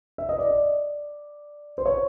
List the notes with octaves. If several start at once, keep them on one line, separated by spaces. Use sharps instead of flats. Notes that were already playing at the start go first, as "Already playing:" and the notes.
E5
D#5
D5
C5
C#5